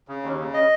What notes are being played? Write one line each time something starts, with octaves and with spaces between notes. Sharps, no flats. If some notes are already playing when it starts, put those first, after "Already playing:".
C#3
D#2
C#3
D#5